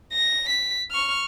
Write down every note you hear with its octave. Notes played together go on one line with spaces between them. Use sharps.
A#6
B6
C#6 F6